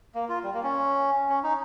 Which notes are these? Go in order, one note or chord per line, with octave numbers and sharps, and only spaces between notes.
A#3
F4
G3
A#3
C#4
C#4
D#4